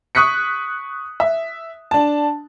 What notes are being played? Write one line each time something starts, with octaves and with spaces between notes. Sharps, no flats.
C#6 D#6 F#6 B6 C#7
E5
D4 A5